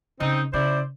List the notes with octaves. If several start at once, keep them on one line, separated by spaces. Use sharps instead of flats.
C#3 C4 D#4
C#3 E4 C5 D5